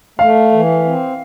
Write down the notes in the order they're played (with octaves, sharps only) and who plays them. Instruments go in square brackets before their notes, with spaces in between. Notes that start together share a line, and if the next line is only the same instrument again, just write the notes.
[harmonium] A3 [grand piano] F5
[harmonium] E3
C4